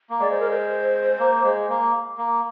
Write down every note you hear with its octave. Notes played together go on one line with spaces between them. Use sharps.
A#3
G#3 D5
C5
A#4
C5
A#3
G#3
A#3
A#3